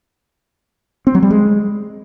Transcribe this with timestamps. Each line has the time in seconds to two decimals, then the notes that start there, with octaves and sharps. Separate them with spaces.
1.07 C4
1.15 F#3
1.23 G3
1.30 G#3